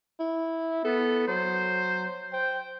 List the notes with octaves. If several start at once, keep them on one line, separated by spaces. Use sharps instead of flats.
E4
B3 A4
F#3 C5
C5 G5